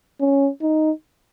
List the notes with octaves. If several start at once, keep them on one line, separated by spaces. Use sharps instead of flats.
C#4
D#4